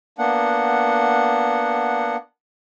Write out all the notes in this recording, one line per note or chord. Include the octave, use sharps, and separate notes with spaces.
A#3 B3 D4 F#5